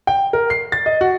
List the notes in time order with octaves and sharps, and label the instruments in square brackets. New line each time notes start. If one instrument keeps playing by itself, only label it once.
[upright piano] G5
A#4
C7
A6
D#5
F#4